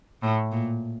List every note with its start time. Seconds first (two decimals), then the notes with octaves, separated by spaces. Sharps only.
0.22 A2
0.52 A#2